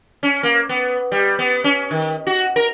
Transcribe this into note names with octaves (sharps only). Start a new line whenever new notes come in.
C#4
A#3
B3
G3
B3
C#4
D#3
F#4
A#4